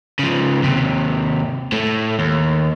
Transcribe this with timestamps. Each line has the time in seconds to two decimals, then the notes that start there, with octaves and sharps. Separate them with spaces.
0.19 C#3 F3
0.62 D#2 C3
1.72 A2 A3
2.19 D#2